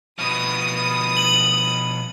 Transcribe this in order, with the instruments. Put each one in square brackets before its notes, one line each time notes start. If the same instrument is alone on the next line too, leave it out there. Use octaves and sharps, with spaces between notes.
[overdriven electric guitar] B2 F3 [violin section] D#6
[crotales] F#7